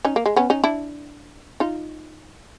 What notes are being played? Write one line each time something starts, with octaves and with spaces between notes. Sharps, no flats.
C#4 D#4
A#3
G#3
B3 C#4
C#4 D#4
D4 E4
D#4 F4